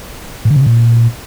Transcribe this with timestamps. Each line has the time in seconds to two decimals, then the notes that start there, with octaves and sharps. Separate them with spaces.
0.45 A2
0.50 D3
0.56 C3
0.61 C#3
0.66 A#2